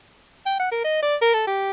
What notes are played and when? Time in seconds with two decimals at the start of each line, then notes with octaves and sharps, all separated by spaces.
0.46 G5
0.59 F#5
0.72 A#4
0.84 D#5
1.03 D5
1.22 A#4
1.34 A4
1.47 G4